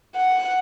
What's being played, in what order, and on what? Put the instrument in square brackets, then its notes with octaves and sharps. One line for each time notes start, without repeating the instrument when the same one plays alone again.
[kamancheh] F#5